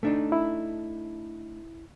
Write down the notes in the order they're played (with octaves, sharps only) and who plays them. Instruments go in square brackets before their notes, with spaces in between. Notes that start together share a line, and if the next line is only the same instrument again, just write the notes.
[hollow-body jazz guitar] A3 D4 D#4
[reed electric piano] E4